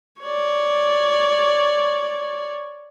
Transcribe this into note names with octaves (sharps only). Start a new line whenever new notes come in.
C#5 D5